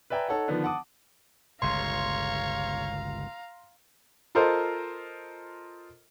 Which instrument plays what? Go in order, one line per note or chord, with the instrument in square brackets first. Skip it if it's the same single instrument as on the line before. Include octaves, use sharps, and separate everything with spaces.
[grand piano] B4 D5 E5 G5 G#5 A#5
D#4 A4 C#5 F#5
D3 D#3 F3 B3 D4
F#5 A5 D6 D#6
[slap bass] G1 C#2 B2 [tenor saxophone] C#5 [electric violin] F5 A#5 [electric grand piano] C6
[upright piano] F4 A4 A#4 C5 D#5